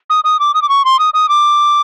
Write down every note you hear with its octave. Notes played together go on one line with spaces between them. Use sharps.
D#6
D#6
D6
D#6
D6
C#6
C6
D#6
D#6
D6